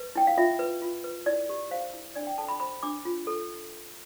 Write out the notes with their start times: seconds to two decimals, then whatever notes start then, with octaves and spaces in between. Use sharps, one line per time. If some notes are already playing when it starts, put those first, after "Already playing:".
Already playing: B4
0.16 E4 G5
0.27 F5
0.38 F4 E5
0.59 B4
0.82 F4
1.04 B4
1.26 E4 D5
1.49 G4
1.71 C5 F5
1.94 E4
2.15 D4 D5
2.27 G5
2.38 A4 A5
2.49 B5
2.60 C5 B5
2.83 D4 D6
3.05 F4
3.27 A4